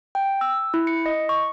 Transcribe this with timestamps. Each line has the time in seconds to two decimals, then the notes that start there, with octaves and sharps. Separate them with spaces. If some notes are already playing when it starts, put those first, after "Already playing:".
0.15 G5
0.41 E6
0.74 E4
0.87 C#7
1.06 D#5
1.29 C#6